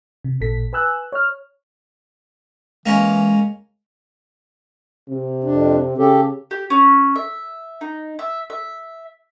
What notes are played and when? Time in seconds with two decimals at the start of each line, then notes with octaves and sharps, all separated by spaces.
0.24 C3
0.40 A1 A#2 A4 B6
0.73 B4 G#5 E6 F#6
1.12 C#5 F6
2.86 E3 G#3 A#3 C#4
5.08 C3
5.44 F2 D4
5.98 C#3 G4 A4
6.51 G4
6.70 C#4
7.16 E5
7.81 D#4
8.19 E5
8.50 E5